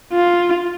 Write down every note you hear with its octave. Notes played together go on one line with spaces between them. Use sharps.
F4